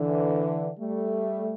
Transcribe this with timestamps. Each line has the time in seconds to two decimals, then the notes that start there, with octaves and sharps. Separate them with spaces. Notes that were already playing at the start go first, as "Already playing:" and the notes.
Already playing: D3 E3
0.79 G3 A3